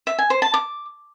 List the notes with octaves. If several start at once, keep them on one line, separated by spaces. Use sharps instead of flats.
E5
G#5
C5
A5
D6